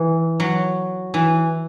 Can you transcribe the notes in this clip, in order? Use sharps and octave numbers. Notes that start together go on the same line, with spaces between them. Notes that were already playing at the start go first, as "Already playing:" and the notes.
Already playing: E3
F#3
E3